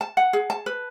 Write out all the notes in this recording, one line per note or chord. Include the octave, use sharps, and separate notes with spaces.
A5
F#5
G#4
A5
B4